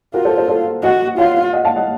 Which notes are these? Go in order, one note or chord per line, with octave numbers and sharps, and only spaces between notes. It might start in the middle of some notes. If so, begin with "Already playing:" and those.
F4 F#4 A#4
A4 C5
A4 C5
A4 C5
F#4 D#5 F#5
F4 C#5 F5
D#5 F#5
F5 A5
D#5 F#5